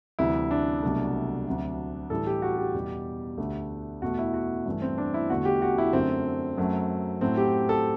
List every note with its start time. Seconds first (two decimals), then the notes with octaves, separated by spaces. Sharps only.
0.19 D2 C3 E3 G3 E4
0.51 D4
0.82 C2 B2 F#3 A3
1.46 D2 C3 F#3
2.10 A2 E3 G3 A4
2.27 G4
2.42 F#4
2.58 G4
2.74 E2 B2 G3
3.38 D2 D3 A3
4.02 E2 B2 A3 F#4
4.19 E4
4.34 F#4
4.66 G2 E3 A3
4.82 C4
4.98 D4
5.14 E4
5.30 E2 D3 A3 F#4
5.45 G4
5.62 F#4
5.78 E4
5.93 F#2 D3 A3 C4
6.57 F#2 F#3 A3
7.21 A2 F#3 A3 C4
7.37 G4
7.69 A4